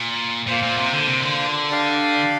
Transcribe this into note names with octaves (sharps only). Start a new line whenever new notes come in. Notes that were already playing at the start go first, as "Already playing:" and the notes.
Already playing: A#2
A#2 A#3 F4 C5
A#2
C3
D3
C3
D3
D4 G4 D5 F5